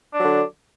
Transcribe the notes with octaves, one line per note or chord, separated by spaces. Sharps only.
D3 F#3 D4